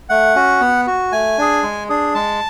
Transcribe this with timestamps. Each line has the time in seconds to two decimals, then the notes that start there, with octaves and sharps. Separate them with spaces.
0.09 A3 F#5
0.35 C#4 F#4
0.61 B3
0.87 F#4
1.12 A3 G#5
1.38 D4 G#4
1.63 G#3
1.89 D4 G#4
2.15 G#3 A5